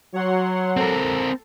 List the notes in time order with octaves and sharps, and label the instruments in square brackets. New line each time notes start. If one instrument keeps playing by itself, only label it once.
[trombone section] F#3 [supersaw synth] C#5 F#5 C6
[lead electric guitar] C4 A#4 [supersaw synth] A4